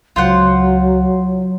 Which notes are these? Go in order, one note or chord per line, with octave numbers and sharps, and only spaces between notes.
C#2 F#3 F4 C5 F#5